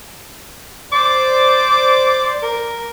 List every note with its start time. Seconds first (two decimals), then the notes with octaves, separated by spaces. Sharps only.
0.92 C5 D5 D6
2.42 A#4